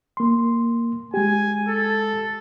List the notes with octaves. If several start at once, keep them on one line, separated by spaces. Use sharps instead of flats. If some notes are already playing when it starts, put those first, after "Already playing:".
A#3 C6
G#3 G4 G#5
A4